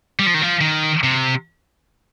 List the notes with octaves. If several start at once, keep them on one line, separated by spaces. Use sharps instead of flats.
G3
F3
D#3
F3
D#3
C3